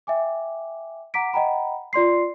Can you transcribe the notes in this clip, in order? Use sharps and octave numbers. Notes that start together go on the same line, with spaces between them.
E5 G5 G#5 D6
F#5 A#5 D6 B6 D7
D#5 F#5 G5 A#5 B5
F4 D5 C6 C7